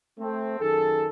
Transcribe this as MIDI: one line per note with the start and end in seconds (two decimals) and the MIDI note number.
0.19 0.57 57
0.19 0.57 60
0.60 1.07 42
0.60 1.07 51
0.60 1.07 68
0.60 1.07 69